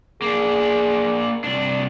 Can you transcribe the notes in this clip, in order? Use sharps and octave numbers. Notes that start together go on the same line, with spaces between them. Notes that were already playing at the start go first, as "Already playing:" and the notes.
A#3 D4 G#4
C2 D4